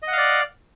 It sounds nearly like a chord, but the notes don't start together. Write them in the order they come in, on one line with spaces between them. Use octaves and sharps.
D#5 F#5 F5 D5